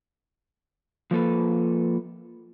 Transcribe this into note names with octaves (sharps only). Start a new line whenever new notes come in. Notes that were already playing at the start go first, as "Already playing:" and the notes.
F3 A#3 A4 B4